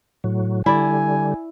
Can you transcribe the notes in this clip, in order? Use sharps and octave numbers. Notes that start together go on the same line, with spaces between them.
A2 F#3
D3 G3 E4 D5 G#5